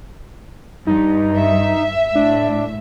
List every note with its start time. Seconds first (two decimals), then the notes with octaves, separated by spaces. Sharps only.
0.87 G2 D#4
1.37 E5
2.15 A2 D4